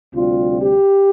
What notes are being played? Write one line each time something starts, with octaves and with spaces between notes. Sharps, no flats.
D2 C3 G3 F4
G4